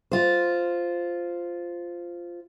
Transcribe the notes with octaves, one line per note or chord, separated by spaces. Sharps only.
F4 C5